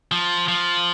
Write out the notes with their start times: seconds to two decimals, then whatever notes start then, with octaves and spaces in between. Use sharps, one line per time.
0.12 F3
0.48 F3